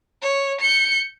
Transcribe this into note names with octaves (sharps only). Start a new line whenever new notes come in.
C#5
G6 C#7